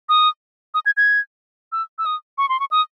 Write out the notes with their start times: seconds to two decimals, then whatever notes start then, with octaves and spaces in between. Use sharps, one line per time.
0.09 D#6
0.74 D#6
0.86 G#6
0.97 G#6
1.72 E6
1.99 E6
2.06 D#6
2.38 C#6
2.49 C6
2.60 C#6
2.71 D#6